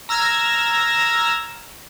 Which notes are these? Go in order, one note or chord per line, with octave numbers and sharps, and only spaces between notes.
A#5 E6 F6 G#6 A#6